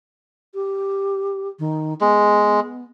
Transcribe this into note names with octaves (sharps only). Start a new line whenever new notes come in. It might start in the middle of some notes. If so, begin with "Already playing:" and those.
G4
D#3
G#3 B3